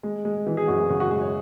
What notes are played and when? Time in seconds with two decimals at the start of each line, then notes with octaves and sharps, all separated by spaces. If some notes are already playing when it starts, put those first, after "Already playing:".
0.03 G#3
0.25 G#3
0.47 E3
0.57 G#4
0.67 F#2 F#4
0.78 G#4
0.90 C#3 F#4
1.00 F#4
1.11 G#3 G#4
1.22 C#5